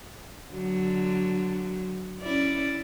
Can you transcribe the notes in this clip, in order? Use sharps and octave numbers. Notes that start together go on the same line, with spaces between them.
D3 F#3
C#4 E4 D5